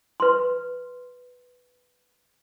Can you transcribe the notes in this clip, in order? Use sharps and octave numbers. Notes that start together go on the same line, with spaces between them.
B4 C6